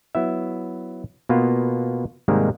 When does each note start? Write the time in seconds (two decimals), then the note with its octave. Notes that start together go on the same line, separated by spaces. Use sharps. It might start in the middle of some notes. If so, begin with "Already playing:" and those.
0.15 F#3 B3 E4 E5
1.29 B2 A#3 B3 F4
2.28 G#2 C3 D#3 G3 G#3 A#3